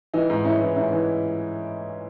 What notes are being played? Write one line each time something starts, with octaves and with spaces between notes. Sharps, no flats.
E3 D#4
G#2
G#2 C#4 E4
E3
G#2 C#4 E4
E3